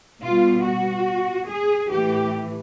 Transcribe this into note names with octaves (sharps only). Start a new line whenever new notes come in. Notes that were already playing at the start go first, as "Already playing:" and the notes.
B2 G3 B3 F4
F#4
G#4
A2 E3 A3 G4